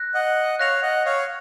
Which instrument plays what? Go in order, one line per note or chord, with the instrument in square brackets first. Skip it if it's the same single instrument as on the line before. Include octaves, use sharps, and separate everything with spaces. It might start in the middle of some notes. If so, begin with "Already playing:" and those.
Already playing: [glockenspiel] F#6 A#6
[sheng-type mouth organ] D#5 F#5
[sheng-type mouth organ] C#5 F5 [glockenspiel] F#6 A#6 F7
[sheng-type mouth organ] D#5 F#5
C#5 F5